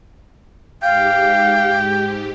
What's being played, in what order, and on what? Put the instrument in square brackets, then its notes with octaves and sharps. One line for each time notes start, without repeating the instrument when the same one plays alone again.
[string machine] G#2 G4 [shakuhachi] F5 [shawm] G5